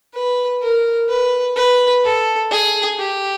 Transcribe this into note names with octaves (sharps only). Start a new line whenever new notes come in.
B4
A#4
B4
B4
A4
G#4
G4